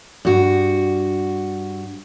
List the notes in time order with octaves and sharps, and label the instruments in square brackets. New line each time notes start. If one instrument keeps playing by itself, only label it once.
[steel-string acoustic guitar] G2 F#4